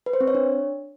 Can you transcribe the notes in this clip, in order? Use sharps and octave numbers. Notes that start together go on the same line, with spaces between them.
B4
C5
C4
C#5
D4